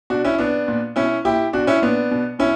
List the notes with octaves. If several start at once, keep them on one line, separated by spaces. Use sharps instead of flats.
B2 D4 F#4
C#4 E4
B2 B3 D4
A#2
B2 C#4 E4
A#2 E4 G4
B2 D4 F#4
C#4 E4
A#2 B3 D4
B2
B2 C#4 E4